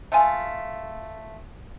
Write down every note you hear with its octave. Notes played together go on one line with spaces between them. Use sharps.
A3 F4 G#5